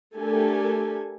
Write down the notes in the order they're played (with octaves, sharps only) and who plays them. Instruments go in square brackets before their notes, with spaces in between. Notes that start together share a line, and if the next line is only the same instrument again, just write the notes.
[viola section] A3 D4 G4 A4 A#4 G#5